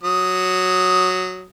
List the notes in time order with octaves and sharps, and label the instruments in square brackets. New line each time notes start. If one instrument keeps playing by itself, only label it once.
[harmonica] F#3 D#6